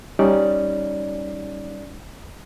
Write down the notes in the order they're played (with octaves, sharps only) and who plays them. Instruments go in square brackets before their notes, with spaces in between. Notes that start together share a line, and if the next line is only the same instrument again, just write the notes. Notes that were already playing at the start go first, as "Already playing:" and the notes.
[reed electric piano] G3 C#4 D#4 D5